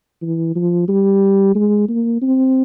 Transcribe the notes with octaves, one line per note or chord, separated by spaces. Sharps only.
E3
F3
G3
G#3
A#3
C4